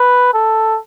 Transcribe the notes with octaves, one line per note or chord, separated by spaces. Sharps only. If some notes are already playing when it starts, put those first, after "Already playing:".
Already playing: B4
A4